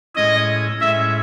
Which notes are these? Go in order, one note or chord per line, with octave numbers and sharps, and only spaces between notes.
A2 G#3 C#4 E4 D#5
A2 G#3 C#4 E4 E5